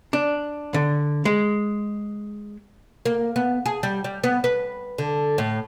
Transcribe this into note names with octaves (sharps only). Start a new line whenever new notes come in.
D4
D3
G#3
A#3
B3
G#4
G3
G3
B3
B4
D3
A2